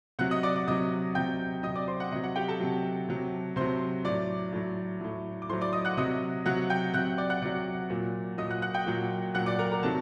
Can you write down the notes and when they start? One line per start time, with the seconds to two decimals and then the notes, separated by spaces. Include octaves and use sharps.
0.19 C3 F#3 F#5 F#6
0.31 D#5 D#6
0.43 D5 D6
0.55 D5 D6
0.68 C3 F#3 D#5 D#6
1.15 C3 F#3 G5 G6
1.63 C3 F#3 D#5 D#6
1.75 D5 D6
1.88 C5 C6
2.00 F#5
2.11 C3 F#3 D#5
2.24 F#5
2.36 G4 G5
2.48 A4 A5
2.60 C3 F#3
3.08 C3 F#3
3.56 C3 F#3 C5 C6
4.05 A2 F#3 D5 D6
4.53 A2 F#3
5.01 A2 F#3
5.42 D6
5.49 A2 F#3 C5 C6
5.61 D5 D6
5.73 D#5 D#6
5.85 F#5 F#6
5.97 C3 F#3 D#5 D#6
6.46 C3 F#3 F#5 F#6
6.70 G5 G6
6.94 C3 F#5 F#6
6.99 F#3
7.18 D5 D6
7.30 F#5 F#6
7.42 C3 F#3 D5 D6
7.90 A#2 F#3
8.38 A#2 F#3 D#5 D#6
8.50 F#5 F#6
8.62 F#5 F#6
8.74 G5 G6
8.86 A#2 F#3
9.34 A#2 F#3 F#5 F#6
9.46 D5 D6
9.59 A#4 A#5
9.71 A#4 A#5
9.83 C3 D#3 F#3 A4 A5